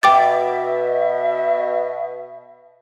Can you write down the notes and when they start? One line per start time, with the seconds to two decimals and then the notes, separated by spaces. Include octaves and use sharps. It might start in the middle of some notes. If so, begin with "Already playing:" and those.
0.03 B2 E5 G5 D6 A6